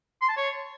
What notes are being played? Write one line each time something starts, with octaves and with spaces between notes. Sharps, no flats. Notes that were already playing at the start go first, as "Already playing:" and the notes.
C6
A5
C#5